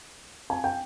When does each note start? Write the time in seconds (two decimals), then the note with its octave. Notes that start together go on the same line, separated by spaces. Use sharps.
0.50 G#5
0.64 G5